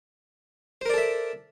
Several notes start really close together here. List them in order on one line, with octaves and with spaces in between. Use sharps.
C5 A#4 D5 A4 E5